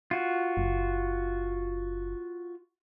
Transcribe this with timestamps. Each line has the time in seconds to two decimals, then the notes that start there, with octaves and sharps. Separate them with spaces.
0.11 F4 F#4
0.57 F#1